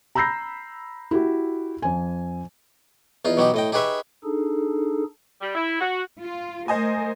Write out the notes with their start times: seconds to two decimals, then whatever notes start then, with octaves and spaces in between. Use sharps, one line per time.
0.15 A#5 B5 E6 G6 A#6 C7
1.11 E4 F#4 G4
1.82 F2 G#5
3.25 E2 D#4 F4
3.37 B2 F#3 D#4 G4
3.54 A2 D#5 G5
3.72 D#4 G4 G#4 B4 C#5 E5
4.24 D4 D#4 G#4 A4
5.41 G3
5.55 E4
5.80 F#4
6.19 F4
6.68 A3 A#4 C5 D#5 G#5